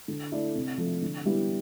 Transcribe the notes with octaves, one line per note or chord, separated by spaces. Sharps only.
D3
A3 E4 A4 D5
C3
F3 A3
D3
G3 B3 E4 G4